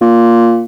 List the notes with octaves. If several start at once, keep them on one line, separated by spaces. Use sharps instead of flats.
A#2